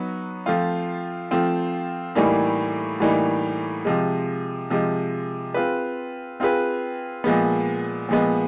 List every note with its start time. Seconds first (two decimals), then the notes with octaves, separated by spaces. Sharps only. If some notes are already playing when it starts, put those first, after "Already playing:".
Already playing: F#3 B3 D#4
0.46 F3 A3 C4 F4
1.31 F3 A3 C4 F4
2.15 A2 E3 G3 A#3 D#4
3.00 A2 E3 G3 A#3 D#4
3.85 C3 F3 G#3
4.70 C3 F3 G#3
5.54 C4 F4 G#4 B4
6.40 C4 F4 G#4 B4
7.24 A#2 F3 G#3 B3
8.09 A#2 F3 G#3 B3